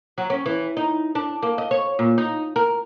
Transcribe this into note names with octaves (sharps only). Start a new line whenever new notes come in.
F#3
C#4
E3
D#4
D4
A#3
D#5
C#5
A#2
D#4
A#4